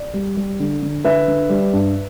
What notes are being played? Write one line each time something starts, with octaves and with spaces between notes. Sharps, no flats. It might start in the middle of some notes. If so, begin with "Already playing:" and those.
Already playing: D5
G3
G3
D3
D3
D3 B4 E5
D3
G3
G2